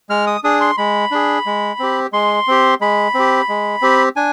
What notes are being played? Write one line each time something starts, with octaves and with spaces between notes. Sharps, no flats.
G#3 F6
D#6
D4 G#4 D#6
C6
G#3 B5
D4 G#4
G#3
C4 G4
G#3 C6
C4 G4
G#3 B5
C4 G4
G#3
C4 G4
D4 G#5